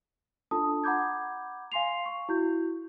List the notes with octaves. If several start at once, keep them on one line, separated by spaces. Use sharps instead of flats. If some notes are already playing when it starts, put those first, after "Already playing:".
D4 F4 A4 A5 D#6
F#5 A#5 B5 D6 G6 G#6
F5 G#5 C6 C7 F7
C#6
E4 F#4 G6